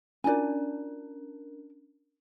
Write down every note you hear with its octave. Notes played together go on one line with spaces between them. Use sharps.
C#4 D4 A#4 D5 G#5